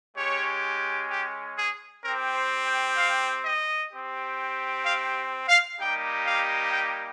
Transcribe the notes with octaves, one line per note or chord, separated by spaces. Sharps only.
G#3 C#4 G4 C#5
G4
G#4
C4 G4 A#4
C5
G5
F5
D#5
C4 G4
F5
F5
G3 A#3 D#4 G4 G5
F5
G5